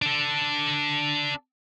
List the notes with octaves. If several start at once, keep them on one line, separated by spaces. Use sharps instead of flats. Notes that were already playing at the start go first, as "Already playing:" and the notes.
D4 A4